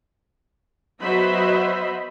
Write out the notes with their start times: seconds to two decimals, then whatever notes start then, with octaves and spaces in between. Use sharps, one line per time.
1.01 F#3 B3 C5 D#5 E5 B5